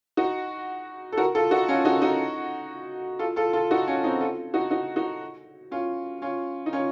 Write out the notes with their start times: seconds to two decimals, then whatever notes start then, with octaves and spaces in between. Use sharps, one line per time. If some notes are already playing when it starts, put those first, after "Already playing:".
0.17 D#4 F#4
1.12 A4
1.18 F#4 A#4
1.35 F4 A4
1.51 D#4 F#4
1.68 C#4 F4
1.85 D#4 F#4
2.02 D#4 F#4
3.19 F4 A4
3.36 F4 A4
3.53 F4 A4
3.71 D#4 F#4
3.88 C#4 F4
4.04 C4 D#4
4.21 F4 A4
4.54 D#4 F#4
4.71 D#4 F#4
4.96 D#4 F#4
5.71 C#4 F4
6.22 C#4 F4
6.66 D#4
6.73 C#4 F4